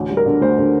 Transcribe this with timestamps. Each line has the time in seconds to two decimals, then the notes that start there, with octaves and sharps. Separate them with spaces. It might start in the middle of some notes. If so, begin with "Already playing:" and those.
Already playing: A1 D2
0.10 G3
0.17 A#4
0.26 D3
0.41 D2 C5
0.58 D3